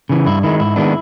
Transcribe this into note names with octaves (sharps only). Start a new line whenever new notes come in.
C#3 E3
G2 E4
D#3 G#3 E4
G#2 E4
D#3 G#3 B3 D4